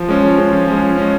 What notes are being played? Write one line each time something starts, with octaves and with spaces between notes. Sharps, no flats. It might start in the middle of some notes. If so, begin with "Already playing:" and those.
Already playing: F3
G#3 C#4
F3
G#3 C#4
F3
G#3 C#4
F3
G#3 C#4